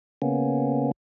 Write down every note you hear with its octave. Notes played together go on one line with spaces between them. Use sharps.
C#3 A#3 B3 C#4